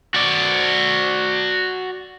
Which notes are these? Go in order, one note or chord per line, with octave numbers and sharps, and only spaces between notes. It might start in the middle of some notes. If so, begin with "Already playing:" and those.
F#4 D5